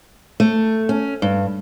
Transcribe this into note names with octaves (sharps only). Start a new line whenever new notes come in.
A3
C#4
G2